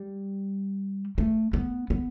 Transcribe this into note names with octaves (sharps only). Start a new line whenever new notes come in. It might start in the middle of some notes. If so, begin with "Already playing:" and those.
Already playing: G3
A3
B3
B3